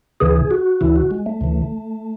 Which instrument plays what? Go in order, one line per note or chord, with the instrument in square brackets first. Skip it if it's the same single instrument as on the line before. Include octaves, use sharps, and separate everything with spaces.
[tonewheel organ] D2 C#3 E3 G#4
F#4
D2 C#3 E3 E4
F#4
G#3
A3
D2 C#3 E3